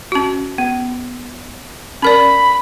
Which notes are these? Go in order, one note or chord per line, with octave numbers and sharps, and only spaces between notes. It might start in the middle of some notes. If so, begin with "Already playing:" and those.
C#4 F#4
B3
C#4 A#4 D5 B5